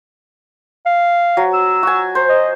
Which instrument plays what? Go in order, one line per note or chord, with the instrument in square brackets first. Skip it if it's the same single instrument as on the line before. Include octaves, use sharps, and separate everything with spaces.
[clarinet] F5
[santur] F#3
[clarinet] E6
[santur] F#4 G#5
C5
[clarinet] D#5